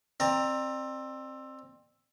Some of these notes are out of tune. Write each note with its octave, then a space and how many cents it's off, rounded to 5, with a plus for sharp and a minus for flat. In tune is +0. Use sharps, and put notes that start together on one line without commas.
C4 +15 D5 +40 A#5 +0